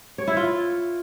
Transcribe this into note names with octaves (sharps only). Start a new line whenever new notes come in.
C#5
E4
F4